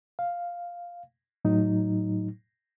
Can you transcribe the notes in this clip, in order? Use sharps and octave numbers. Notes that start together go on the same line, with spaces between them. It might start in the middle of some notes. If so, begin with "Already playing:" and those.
F5
A2 F#3 D#4